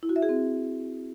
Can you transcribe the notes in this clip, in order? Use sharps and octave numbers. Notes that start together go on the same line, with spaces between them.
E4
F#4
E5
G#4
C4